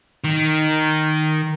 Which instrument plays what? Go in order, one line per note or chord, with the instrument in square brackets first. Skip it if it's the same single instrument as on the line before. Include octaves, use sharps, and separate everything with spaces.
[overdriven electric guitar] D#3